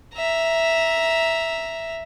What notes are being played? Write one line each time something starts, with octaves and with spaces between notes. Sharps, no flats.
E5 A#5